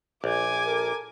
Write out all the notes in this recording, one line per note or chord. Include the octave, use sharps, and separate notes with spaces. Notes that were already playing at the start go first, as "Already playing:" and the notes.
A#1 G#5 D6
A4 A#4